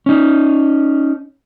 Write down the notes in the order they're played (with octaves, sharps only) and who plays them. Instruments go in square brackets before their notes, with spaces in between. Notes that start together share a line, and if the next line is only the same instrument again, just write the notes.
[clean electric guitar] C#4 D#4